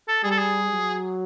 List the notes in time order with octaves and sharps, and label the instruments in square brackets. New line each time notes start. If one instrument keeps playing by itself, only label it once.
[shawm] A4
[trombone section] G3 [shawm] G#4
[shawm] A4
G#4
[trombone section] F#3